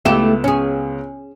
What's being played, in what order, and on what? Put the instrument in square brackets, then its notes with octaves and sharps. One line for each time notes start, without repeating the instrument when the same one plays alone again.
[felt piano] C#2 B3 E7 [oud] A3 E4 G4
[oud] C#4 G#4